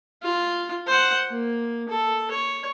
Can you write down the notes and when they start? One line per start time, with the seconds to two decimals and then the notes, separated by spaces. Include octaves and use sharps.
0.23 F4
0.87 C5 F#5
1.29 A#3
1.88 A4
2.30 C#5